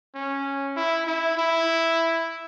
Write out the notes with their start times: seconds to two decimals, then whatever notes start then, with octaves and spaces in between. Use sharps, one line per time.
0.15 C#4
0.76 E4
1.07 E4
1.38 E4